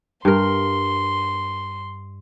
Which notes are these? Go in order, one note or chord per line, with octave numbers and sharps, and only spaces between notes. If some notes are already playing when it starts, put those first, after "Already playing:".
G2 A#4 C6